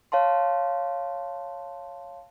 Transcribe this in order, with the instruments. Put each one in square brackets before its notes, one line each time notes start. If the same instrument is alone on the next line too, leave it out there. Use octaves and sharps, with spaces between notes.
[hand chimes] C#5 F5 A5 C6